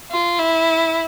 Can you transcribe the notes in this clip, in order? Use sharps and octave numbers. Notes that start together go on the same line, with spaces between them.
F4
E4